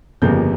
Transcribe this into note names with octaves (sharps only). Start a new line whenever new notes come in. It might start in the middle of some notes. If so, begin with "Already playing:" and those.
G1 F2 C#3 G3 A#3 G6